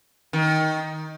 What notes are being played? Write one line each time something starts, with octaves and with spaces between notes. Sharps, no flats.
D#3